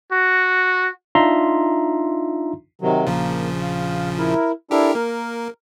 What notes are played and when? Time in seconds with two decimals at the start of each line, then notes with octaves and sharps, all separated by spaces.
0.12 F#4
1.15 D4 D#4 F4 E5 A#5 C6
2.81 C3 D#3 F#3
3.06 A#1 C#3 F3 A#3
3.62 F5
4.18 E4 A#4
4.71 D4 E4 G4 A4 A#4
4.95 A#3 A#4